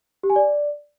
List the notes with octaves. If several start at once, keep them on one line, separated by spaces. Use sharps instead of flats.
G4
G#5
D5